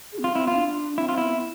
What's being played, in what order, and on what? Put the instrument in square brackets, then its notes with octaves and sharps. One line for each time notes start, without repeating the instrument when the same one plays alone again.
[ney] G#4
B3
[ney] C4 [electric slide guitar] F4
[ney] C4 [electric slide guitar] E4
[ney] B3 [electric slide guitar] F4
[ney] D4
[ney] C4 [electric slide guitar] E4
[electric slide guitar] F4
[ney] B3 [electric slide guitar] E4
[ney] B3